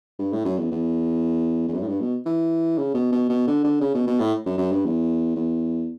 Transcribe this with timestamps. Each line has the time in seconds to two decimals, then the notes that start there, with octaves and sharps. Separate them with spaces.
0.19 G2
0.33 A2
0.45 F#2
0.58 E2
0.72 E2
1.68 E2
1.74 F#2
1.83 A2
1.88 G2
2.01 B2
2.26 E3
2.78 C#3
2.95 B2
3.12 B2
3.29 B2
3.47 D3
3.64 D3
3.81 C#3
3.95 B2
4.07 B2
4.20 A2
4.46 F#2
4.58 F#2
4.72 G2
4.85 E2
5.36 E2